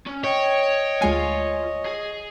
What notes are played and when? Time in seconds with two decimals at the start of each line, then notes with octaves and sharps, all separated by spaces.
0.06 C#4
0.24 C#5 D#5 G5
1.02 D2 G#3 F4 G#5
1.85 G#4